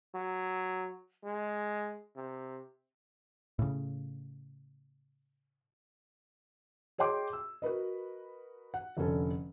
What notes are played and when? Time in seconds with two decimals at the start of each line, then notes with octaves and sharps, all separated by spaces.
0.15 F#3
1.24 G#3
2.16 C3
3.59 A2 C#3
6.98 G#4 C#5 D#5 G5 C6 D6
7.33 E6
7.62 F#4 A#4 B4 D#5
8.74 F#5
8.97 F1 D3 C#4 A4